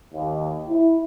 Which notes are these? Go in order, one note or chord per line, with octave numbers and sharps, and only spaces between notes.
D#2
E4